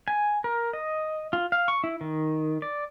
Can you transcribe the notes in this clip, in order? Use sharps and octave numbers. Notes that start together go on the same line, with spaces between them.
G#5
A#4
D#5
F4
F5
C#6
E4
D#3
D5